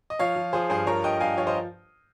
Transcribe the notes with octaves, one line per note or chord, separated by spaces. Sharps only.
D#5
F3 C#5 F5
F3
F3 G#4 C5
G2 G#4 C5
F3 A#4 C#5
G2 D#5 G5
G2 F5 G#5
F3 C#5 F5
C5 D#5